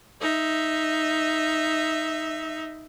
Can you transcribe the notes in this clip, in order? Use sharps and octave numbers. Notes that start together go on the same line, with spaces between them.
D#4 E5